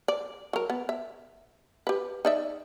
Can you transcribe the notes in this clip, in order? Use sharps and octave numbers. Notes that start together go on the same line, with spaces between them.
D5
F#3 A#4
B3
E5
G4 B4
D#4 D5 E5